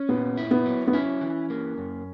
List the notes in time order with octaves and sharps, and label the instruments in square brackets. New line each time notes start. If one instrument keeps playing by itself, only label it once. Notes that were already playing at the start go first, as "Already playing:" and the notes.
Already playing: [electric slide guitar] C#4
[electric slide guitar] A#2 [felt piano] B3
[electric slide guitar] E4
[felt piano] B3
[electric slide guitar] F#3
[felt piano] B3
[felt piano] C#4 [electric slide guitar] E4
[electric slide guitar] E3
A#3
F#2